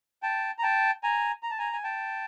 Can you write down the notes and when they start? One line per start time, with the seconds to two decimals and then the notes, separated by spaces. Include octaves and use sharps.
0.23 G5 A5
0.59 A#5
0.63 G5 A5
1.03 G#5 A#5
1.43 A#5
1.51 A5
1.58 G#5 A#5
1.73 G#5
1.84 G5 A5